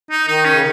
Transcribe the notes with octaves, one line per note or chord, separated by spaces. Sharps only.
D#4
D#3 D#4
C#4
C#3